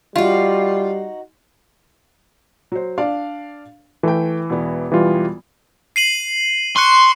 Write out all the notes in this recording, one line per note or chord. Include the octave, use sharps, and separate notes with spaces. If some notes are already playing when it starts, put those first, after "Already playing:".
G3 D#4 F4 F#4
F#3 C5
D4 D5 F5
E3 A3 G5
E1 B3
E3 G3 F4
C7 D#7 F#7
C6 C#6 F#6 C#7